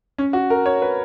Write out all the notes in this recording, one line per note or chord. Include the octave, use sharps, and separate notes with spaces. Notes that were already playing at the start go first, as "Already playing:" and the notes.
C#4
F#4
A#4
C#5
B4